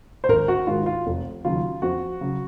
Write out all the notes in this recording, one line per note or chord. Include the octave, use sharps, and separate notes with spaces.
C5
G#1 A#4
F#4
G#2 D#3 G#3 F4
F4
F1
D#2 C#3 F#3 F4
F2 F#4
C#3 F#3